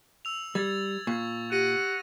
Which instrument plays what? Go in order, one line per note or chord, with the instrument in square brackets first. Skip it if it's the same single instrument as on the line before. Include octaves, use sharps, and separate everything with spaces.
[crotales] E6 F7
[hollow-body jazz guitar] G3 [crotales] G#6 A6
[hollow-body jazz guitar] A#2 [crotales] C#6 G#6
[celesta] G4 [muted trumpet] F#5 [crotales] A#6 D#7